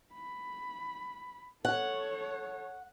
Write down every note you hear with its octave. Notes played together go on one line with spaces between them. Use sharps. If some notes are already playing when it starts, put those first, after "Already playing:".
B5
A4 C#5 F#5